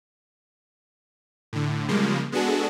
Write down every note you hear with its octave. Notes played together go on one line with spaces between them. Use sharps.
A2 D3
C#3 F3 G3 G#3 A#3
G#3 B3 D4 F#4 G#4 A4